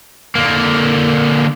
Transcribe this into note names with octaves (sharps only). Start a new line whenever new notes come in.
D3 A#3